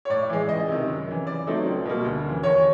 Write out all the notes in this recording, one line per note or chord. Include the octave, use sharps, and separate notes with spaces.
C#5
A2 D5
E3 G#3
C#2 D#5
C3 D#3
F#2
C#3 E3
C#3 D5
F#3 A3 C4 D#4
C#2
B2 G3 A#3
D2
C#3 E3
D#2 C#5